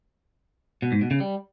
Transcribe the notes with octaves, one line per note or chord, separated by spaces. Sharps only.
B2
G#2
B2
C#3
G3